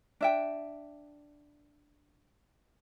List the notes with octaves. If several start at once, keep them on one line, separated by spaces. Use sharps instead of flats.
D4 E5 G5